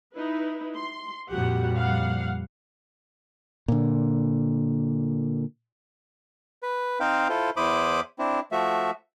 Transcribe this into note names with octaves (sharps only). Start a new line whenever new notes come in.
D#4 E4 B4
C6
F2 A#2 G3 F#4 G4 F#5
F5 F#5
A#2 D3
B4
C4 D#4 C5 F5 G5
E4 F4 A4 C5
E2 E4 C5 B5 D6 D#6
C4 D4 E4
F3 A3 F#4 E5